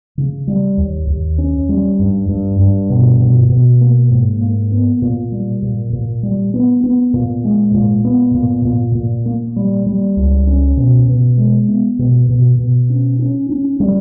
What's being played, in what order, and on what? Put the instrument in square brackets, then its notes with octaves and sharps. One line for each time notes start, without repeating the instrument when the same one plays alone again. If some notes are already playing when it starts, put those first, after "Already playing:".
[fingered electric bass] C#3
G3
D#2
D#2
C#4
G3
G2
G2
G2
B2
B2
B2
A#3
G#2
A#3
B3
A#2
G3
A#2
A#2
G3
B3
B3
A#2
G#3
A#2
B3
A#2
A#2
A#2
A#3
G3
G3
C#2
C#4
B2
B2
G#3
B3
B2
B2
B2
C#4
C#4
C#4
G3